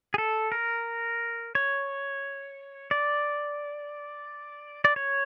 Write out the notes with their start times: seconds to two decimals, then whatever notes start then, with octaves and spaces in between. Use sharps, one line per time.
0.14 G#4
0.18 A4
0.52 A#4
1.55 C#5
2.91 D5
4.85 D5
4.96 C#5